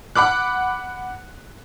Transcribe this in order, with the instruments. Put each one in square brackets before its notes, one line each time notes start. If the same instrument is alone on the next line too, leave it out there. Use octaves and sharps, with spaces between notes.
[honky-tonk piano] F#5 B5 D6 F#6